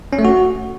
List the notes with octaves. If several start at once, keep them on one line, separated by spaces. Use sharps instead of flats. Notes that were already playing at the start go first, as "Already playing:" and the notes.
C#4
A3
F#4